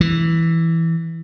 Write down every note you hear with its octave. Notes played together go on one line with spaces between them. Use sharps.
E3